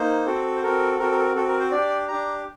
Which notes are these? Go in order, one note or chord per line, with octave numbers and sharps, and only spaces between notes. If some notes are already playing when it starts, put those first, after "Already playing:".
Already playing: A#3 D#4 C5
C4 F#4 A4
C5
C4 F#4 A4 A#4
C4 F#4 A4 A#4
A#4
A4
A#4
C4 F#4 A4
A#4
C5
D4 G4 D5
D4 G4 A#5